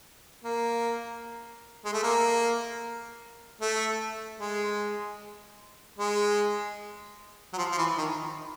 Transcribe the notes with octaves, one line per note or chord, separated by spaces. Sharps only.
A#3
G#3
A3
A#3
A3
G#3
G#3
F#3
F3
F3
E3
D#3